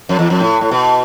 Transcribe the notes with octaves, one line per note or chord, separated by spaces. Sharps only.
F2
E2
F2
A2
A2
B2